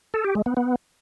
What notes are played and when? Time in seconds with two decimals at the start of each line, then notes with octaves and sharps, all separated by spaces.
0.14 A4
0.25 G4
0.35 G#3
0.46 B3
0.57 B3